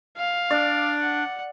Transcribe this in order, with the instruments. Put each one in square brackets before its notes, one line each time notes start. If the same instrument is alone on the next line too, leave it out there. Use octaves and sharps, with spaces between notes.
[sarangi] F5
[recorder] D4 [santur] D5
[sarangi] F#5